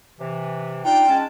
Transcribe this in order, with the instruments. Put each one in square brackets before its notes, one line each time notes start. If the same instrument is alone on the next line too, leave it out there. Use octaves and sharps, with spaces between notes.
[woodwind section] C3 E3
[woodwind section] D4 D#4 F4 [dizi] G5
[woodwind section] G#3 C#4 A5